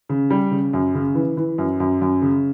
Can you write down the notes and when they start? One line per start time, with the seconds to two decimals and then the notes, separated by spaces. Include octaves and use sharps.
0.09 C#3
0.30 G3
0.51 C#3
0.73 F#2
0.94 C#3
1.15 E3
1.37 E3
1.58 F#2
1.80 F#2
2.02 F#2
2.22 C#3